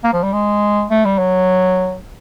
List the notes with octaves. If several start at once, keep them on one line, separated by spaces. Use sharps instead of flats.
A#3
F3
G3
G#3
A3
G3
F#3